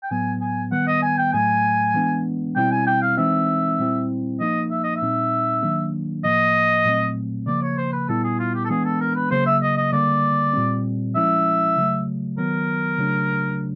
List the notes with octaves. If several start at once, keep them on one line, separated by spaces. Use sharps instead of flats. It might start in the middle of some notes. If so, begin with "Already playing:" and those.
G5
A2 F#3 B3 G#5
G#5
D#3 G3 B3 F#5
D#5
G#5
G5
A2 F#3 A3 G#5
E3 G#3 B3 D4
B2 G3 C4 E4 G5
G#5
G5
F5
E3 G#3 C4 D#4 E5
A#2 G3 C4 E4
F3 A#3 D#4 D#5
E5
D#5
E5
A#2 G3 C4 D#4
D#3 F#3 A#3 D4
A2 F3 A#3 D#5
A#2 F#3 A3 C4
C#3 F3 A#3 D5
C#5
C5
B4
A#2 G3 B3 E4 A4
G#4
F4
G4
A4
E3 G#3 B3 D4 G#4
A4
A#4
B4
C#3 F#3 A#3 C5
E5
D#5
D#5
D3 G3 A#3 D5
A#2 G3 C4
F3 G#3 C#4 E4 E5
C#3 F#3 A3
D#3 F#3 B3 A#4
C#3 F#3 A3 D4